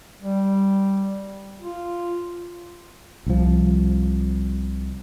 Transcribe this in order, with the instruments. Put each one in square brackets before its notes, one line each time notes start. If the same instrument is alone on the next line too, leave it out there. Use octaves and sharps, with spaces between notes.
[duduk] G3
F4
[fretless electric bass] C2 F3